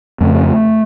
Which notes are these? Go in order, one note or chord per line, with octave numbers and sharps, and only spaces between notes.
F2 C#3 A3